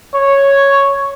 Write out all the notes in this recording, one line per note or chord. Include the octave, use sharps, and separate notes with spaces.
C#5